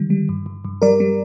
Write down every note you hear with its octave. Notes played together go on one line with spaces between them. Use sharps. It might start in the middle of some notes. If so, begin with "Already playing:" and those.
Already playing: D3 D#3 G3
G3
G2
G2
G2
G3 A#4 D5
G3